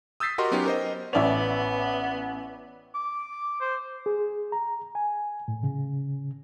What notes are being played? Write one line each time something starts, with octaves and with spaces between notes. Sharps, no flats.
D#6 E6 G6 A6 B6 C7
F#4 G4 A#4 D#5 C6
F#3 B3 C#4 D#4 G4
A#4 C5 D#5
A1 B3 C#5 D5 E5 F7
D6
C5
G#4
A#5
G#5
A2
C#3